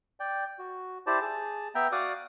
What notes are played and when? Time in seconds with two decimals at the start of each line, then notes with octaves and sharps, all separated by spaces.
0.20 D5 G5
0.59 F#4
1.07 E4 G4 C5 D5 A5
1.21 G#4 A5
1.75 B3 E5 G5 A#5
1.92 F#4 D5 F5 F#5 D6 D#6